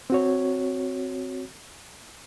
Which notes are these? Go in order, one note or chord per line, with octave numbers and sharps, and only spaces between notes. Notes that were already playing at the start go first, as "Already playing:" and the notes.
C4 F#4 C#5